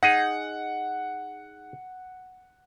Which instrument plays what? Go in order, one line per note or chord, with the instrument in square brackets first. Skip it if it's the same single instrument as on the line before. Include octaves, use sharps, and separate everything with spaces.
[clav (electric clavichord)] D#4 G#4 [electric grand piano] F#5